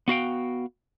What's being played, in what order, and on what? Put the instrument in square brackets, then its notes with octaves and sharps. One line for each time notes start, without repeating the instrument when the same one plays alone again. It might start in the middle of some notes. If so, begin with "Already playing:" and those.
[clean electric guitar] B3 F#4 F5 G5